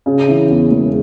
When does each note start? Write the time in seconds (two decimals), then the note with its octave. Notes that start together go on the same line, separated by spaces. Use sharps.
0.06 C#3
0.28 E3
0.50 E2
0.71 E1